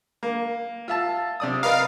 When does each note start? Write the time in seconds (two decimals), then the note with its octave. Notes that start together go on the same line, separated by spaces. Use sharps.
0.23 A#3
0.88 F4 E5 A5
1.40 C3 D5 D#6
1.63 A#4 B4 D#5 F5